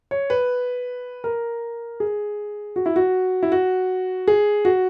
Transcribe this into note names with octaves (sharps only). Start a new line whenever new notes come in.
C#5
B4
A#4
G#4
F#4
E4
F#4
E4
F#4
G#4
F#4